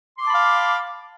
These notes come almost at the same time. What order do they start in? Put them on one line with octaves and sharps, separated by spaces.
C6 D6 A5 B5 F5